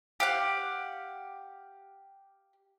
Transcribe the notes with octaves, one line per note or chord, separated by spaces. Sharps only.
G4 F5 F#5